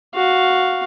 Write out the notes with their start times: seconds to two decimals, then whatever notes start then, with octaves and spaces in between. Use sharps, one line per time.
0.15 F#4 F5